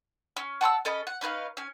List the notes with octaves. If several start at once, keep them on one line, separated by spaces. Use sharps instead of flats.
C#4
F#5 A5 C#6 E6
C#4 A4 D#5 B5
F#5
C#4 D#4 B4 F5
C#4 G#5